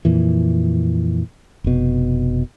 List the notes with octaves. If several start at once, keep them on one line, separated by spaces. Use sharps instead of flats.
F2 A#2 E3
F1 B2